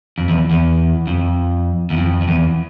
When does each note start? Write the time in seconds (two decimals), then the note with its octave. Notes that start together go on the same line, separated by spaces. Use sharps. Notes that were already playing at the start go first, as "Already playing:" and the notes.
0.18 F2
0.29 E2
0.51 E2
1.07 F2
1.90 E2
1.97 F2
2.21 F2
2.28 E2